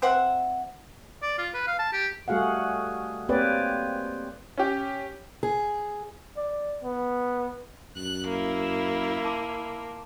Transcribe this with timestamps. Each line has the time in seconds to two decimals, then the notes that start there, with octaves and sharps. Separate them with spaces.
0.02 C4 C5 E5 F#5
1.22 D5
1.38 F4
1.54 B4
1.67 F5
1.79 A5
1.93 G4
2.28 G3 A3 F#4 G#4 F5 F#5
3.29 A#3 C4 G4 B4 C#5 D5
4.58 C#4 G4
5.43 G#4
6.37 D5
6.84 B3
7.97 F#2 F#6 F#7
8.29 A#3 E4
8.63 E7
9.25 A5 C6 D6